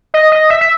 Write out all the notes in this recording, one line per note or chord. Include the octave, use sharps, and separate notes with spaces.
D#5
D#5
E5
E5